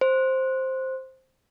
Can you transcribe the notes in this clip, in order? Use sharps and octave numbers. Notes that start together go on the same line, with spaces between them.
C5